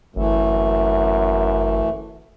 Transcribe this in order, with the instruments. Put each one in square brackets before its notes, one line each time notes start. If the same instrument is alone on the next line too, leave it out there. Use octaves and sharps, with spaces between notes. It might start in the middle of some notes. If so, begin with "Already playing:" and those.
[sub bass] G1 [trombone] F#2 [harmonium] E3 A3